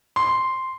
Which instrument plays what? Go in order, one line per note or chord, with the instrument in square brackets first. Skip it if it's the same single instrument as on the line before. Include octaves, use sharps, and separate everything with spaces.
[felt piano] C6